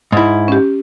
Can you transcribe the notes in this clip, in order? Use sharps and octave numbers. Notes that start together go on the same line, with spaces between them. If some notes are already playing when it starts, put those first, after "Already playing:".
G#2 E4
C#4 G4